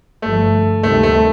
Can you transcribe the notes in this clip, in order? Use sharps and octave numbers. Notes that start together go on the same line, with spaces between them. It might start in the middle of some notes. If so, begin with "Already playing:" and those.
G1 G2 F3 A3
D2 C3 D#3 G3 A3 C4
A3